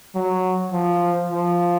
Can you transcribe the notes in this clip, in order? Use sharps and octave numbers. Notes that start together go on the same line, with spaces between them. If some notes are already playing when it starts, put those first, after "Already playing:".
F#3
F3
F3